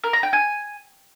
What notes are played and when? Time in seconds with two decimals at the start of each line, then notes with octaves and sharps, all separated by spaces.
0.04 A#4
0.13 A#5
0.23 G5
0.33 G#5